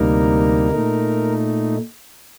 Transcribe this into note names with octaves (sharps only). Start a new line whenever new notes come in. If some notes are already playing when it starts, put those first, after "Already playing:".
Already playing: D2 C3 G3 A#3 D#4 A#4
A#2 A3 D#4